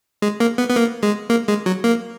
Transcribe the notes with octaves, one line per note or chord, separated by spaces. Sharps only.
G#3
A#3
B3
B3
A#3
G#3
A#3
G#3
F#3
A#3